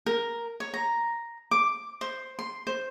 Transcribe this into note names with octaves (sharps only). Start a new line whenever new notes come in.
A#4
C#5
A#5
D6
C5
C6
C5